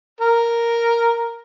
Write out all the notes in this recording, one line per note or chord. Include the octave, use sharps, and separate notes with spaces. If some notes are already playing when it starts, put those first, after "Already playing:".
A#4